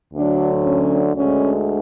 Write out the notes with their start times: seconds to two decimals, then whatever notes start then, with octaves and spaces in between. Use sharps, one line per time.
0.13 D2 D3 F#3 D4
0.63 C#4
1.14 D2 D3 G#3 C#4